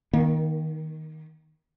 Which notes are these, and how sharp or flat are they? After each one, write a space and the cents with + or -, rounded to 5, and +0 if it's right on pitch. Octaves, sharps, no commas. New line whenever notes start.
D#3 +10 A#3 +40